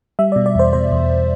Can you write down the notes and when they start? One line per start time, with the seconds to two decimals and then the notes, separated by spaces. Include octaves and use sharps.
0.19 G3 E5
0.32 B2 D5
0.46 D5
0.55 E2 C5
0.73 B2 C5
0.92 E2